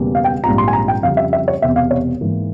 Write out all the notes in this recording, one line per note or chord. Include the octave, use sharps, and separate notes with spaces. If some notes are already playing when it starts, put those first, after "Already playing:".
Already playing: E1 E2 C#3 G3 A#3
F5
G5
A#1 G#2 G3 C4 F4 A#5
C6
G#5
A#5
G5
F2 C#3 G3 C4 F5
E5
E5
C#5
E1 E2 C3 E5
F5
C#5
G#2 E3 A#3